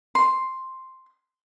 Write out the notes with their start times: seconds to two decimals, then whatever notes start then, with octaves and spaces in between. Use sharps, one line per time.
0.15 C6